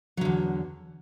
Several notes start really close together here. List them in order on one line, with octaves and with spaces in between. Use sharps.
F#3 D3 E2